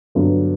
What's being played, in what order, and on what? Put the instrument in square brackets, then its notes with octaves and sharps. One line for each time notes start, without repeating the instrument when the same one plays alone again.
[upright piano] G2 D3 F#3 B3